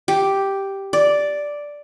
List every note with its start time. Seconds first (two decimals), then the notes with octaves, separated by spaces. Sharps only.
0.08 G4
0.93 D5